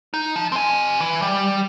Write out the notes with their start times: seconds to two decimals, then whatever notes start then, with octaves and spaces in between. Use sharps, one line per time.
0.14 D#4
0.36 F3
0.52 C4 G#5
1.00 E3
1.22 G3